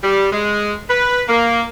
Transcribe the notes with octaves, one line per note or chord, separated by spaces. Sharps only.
G3
G#3
B4
A#3